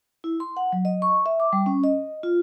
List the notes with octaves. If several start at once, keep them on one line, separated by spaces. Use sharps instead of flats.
E4
C6
F#5
F#3
D#5
C#6
E5
D6
G3
C#4
D#5
F4